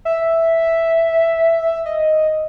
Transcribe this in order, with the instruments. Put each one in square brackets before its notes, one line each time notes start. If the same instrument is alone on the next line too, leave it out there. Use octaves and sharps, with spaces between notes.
[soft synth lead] E5
D#5